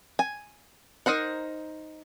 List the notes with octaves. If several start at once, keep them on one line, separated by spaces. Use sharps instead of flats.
G#5
D#4 A#4 C5 F#5